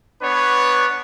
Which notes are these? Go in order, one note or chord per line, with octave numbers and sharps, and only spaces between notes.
B3 D4 B4 C#5